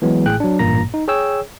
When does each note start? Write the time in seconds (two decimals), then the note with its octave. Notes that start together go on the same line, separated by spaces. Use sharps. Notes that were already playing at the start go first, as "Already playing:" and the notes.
0.02 E3 F#3 G#3 B3
0.26 A1 A2 G#4 G5 F#6
0.40 F#3 D4
0.59 A1 G2 A#2 A#3 A#5 A#6
0.94 D#4
1.08 G#4 C#5 G5 E6